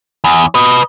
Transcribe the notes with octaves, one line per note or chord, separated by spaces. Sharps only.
E2
B4 D#5